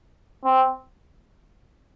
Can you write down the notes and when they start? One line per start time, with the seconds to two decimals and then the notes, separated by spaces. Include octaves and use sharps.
0.45 C4